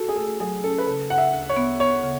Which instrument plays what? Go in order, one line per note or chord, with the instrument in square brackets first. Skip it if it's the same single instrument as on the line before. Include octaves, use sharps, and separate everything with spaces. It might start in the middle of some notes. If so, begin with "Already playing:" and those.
Already playing: [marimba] F#4 [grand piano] A4
[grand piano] G#4
[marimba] A3 [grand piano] A4
[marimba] F#3 [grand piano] G#4
[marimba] C#4 [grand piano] A4
[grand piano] B4
[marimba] C#3 [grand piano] A4
[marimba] C#3 [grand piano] F#5
[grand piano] E5
[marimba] D2
[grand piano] C#5
[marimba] B3
[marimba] B3 [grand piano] C#5
[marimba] C#3